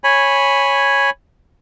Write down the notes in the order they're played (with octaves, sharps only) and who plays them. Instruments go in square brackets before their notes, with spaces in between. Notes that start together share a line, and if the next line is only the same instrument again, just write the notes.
[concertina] C#5 G#5 B5